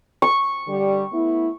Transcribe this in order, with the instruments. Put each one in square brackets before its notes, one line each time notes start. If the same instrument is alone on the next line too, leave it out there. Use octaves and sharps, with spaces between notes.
[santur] C#6
[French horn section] D3 G3
A3 B3 E4